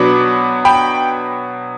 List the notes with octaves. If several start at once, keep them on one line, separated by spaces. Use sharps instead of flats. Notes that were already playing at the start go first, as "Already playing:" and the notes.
Already playing: B2 F#3 B3 D4 B5 D6
G5 B5